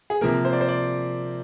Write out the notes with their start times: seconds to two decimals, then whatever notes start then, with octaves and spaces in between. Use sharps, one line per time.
0.10 G#4
0.21 C3 F3 A#3 A#4
0.45 C5
0.53 D5
0.61 C5
0.68 D5